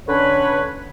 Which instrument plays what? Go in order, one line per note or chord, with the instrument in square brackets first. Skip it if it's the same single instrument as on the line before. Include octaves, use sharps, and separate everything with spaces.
[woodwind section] D3 C#4 B4 C#5